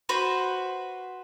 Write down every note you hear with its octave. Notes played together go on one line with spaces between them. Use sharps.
F#4 B4 C5